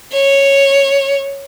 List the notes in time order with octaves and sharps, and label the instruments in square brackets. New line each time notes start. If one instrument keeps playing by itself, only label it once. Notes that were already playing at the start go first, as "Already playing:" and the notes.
[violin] C#5